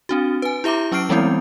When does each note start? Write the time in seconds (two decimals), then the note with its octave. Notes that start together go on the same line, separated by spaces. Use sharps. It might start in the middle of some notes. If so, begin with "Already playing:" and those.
0.09 C4 D4 F#4
0.42 B4 G#5
0.64 E4 G4 E5 A#5 D6
0.92 F#3 C#4 C#6 F6 C7 D7
1.09 E3 G3 G#3 B3 C4 E4